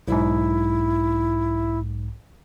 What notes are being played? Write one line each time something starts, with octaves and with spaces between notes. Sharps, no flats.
B1 G#2 E4